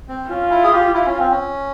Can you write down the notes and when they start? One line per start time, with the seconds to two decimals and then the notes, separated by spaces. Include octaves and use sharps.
0.08 C4
0.30 C#4 F4
0.51 E4
0.64 G#4
0.72 G4
0.94 E4
1.06 C#4
1.19 C4
1.31 C#4